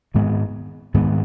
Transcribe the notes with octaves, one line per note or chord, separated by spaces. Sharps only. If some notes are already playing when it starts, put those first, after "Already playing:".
G#2 D#3 G#3 B3
G#2 D#3 G#3 B3